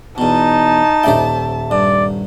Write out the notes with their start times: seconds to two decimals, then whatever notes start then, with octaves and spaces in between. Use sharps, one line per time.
0.18 E2 B2 D#4 A5
1.03 D#1 C5 D5 E5 G5
1.71 G2 D5